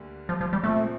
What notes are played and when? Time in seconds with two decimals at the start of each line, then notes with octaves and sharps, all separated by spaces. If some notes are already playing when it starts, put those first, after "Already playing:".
Already playing: D2 D3 G3 A#3
0.29 F3
0.41 F3
0.53 G3
0.64 A#2 F3 A3 C4